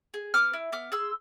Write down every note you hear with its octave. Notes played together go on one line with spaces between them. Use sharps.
G#4
B3 D6 F6
E4
B3 D6 F6
G#4 C6 E6